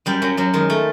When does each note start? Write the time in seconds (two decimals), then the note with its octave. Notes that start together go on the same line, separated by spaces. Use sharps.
0.06 F#2 G3
0.22 F#2 F#3
0.37 F#2 F#3
0.54 D#3 G#3
0.70 A3